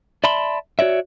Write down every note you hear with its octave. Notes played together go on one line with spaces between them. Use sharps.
D5 E5 A5 B5 C6
F#4 C#5 D5 E5